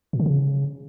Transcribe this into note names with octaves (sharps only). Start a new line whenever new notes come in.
A#2
D3
C#3